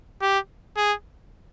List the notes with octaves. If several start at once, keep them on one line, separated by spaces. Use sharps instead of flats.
G4
G#4